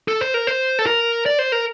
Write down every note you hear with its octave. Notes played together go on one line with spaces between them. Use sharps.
A4
C5
A#4
C5
A4
A#4
D5
C5
A#4